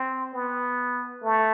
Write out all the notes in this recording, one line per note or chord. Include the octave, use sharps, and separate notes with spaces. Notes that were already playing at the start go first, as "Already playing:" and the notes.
Already playing: C4
B3
A3